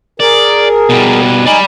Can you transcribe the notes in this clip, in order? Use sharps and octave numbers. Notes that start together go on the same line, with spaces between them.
G#4 A#4 D5
B2 G3
D#4 D5 D#5 G#5 B5